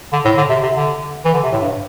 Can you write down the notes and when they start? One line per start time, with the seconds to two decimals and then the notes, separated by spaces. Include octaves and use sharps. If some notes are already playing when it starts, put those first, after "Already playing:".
0.13 D3
0.25 A2
0.37 D3
0.50 C3
0.63 C3
0.75 D3
1.25 E3
1.34 D3
1.43 C3
1.52 A2
1.62 G2